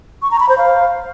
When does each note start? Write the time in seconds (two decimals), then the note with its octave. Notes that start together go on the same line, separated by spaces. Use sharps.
0.22 C#6
0.31 A#5
0.40 B5
0.49 C5
0.58 F5